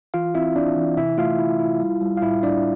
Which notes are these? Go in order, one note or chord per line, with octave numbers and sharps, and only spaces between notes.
E3 F4 F5
C4 E4 E5
C4 D4 D5
E3
C3 E4 E5
A3 F4 F5
E4
E4
G3
G3
F5
A2 E4 E5
A2 D4 D5